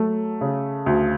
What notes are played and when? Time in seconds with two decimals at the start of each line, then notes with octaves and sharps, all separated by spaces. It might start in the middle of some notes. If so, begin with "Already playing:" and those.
Already playing: F#3 A3
0.41 C#3
0.86 D2